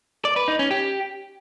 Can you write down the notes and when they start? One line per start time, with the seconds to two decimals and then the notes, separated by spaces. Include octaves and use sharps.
0.25 D5
0.36 B4
0.48 D#4
0.59 C#4
0.71 G4